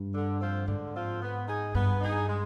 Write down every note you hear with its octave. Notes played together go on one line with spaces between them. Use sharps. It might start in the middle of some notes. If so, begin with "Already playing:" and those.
Already playing: G2
D3
F3 C4 F4 C5
G#2 D3
F3 C4 F4 C5
B3
D#4 G#4
G2 B3
D#4 G#4
G#3